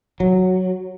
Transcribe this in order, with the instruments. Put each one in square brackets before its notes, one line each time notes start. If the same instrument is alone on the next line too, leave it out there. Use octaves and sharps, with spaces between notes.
[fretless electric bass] F#3